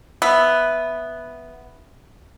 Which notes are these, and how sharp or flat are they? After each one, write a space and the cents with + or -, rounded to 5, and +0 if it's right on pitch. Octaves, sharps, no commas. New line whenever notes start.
B3 +0 E5 +0